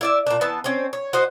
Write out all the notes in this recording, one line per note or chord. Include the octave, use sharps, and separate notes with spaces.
E4 D5 E5
A#2 D4
E3 B3 A5
C4 C#4
C#5
F#4 C5 D#5